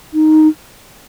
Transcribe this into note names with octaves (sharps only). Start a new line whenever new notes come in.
D#4